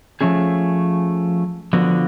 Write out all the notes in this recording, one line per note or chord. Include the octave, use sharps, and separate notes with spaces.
F3 A3 C#4 G#4
D3 F3 B3 F#4